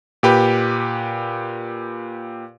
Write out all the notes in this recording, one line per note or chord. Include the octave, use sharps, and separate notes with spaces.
A#2 G4 B4